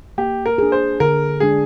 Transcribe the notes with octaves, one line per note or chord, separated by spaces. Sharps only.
A#3 G4
A#4
D4 G#4
C5
D3 A#4
G#3 D4 G#4